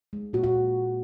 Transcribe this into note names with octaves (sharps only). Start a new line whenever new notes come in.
G#3
A#2 F#4
F#4